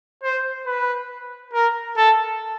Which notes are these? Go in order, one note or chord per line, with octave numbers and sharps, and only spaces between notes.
C5
B4
A#4
A4